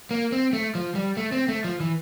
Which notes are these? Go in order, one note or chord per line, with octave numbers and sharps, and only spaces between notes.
A#3
C4
A3
F3
G3
A3
C4
A3
F3
E3